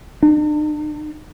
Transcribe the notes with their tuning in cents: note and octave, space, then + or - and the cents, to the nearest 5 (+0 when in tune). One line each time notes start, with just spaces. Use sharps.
D4 +45